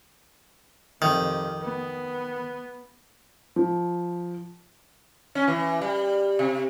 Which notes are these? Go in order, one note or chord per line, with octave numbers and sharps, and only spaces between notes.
F2 C3 D#3
B3
F3
C#4
E3
G3
C3